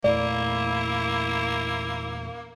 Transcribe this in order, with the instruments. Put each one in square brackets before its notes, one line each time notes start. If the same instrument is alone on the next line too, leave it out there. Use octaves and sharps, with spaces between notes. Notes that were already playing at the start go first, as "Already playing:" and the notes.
[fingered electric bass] E2 A#2 A3 [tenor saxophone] A#3 [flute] E4 [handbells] D5